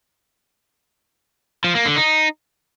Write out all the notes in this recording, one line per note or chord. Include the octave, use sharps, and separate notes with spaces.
F3
A#3
D3
D#4